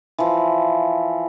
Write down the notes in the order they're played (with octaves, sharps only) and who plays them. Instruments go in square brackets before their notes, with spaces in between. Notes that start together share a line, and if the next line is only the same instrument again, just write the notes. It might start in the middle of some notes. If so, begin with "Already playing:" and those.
[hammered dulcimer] E3 F3